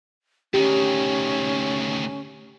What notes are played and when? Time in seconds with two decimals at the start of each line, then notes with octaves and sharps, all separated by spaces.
0.54 D2 D#3 C#4 G4